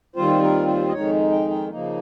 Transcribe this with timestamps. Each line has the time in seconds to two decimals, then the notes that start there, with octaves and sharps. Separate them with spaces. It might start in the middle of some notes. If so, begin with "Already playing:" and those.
0.16 D#2 D#3 G3 C4 F4 C5
0.42 A#4
0.67 C5
0.88 D#5
0.93 F2 D#3 G#3 D#4 C#5
1.31 G5
1.50 G5
1.69 C#3 F3 A#3 D#4